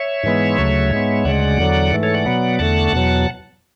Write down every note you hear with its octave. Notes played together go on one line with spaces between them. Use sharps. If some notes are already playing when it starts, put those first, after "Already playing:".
Already playing: C#5 E5
G#2 E3 G#3 B3
D2 C#3 F#3 A3
G#2 G#3 B3
D2 C#3 G#3 D5 F#5
E2 D3 F#3
G#2 E3 A3
A4 C#5
D5 F#5
B2 F#3 B3
E2 D3 A3 F#5 A5
E2 B2 F#3